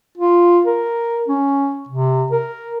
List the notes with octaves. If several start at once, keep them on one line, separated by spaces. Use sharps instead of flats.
F4
A#4
C#4
C3
A#4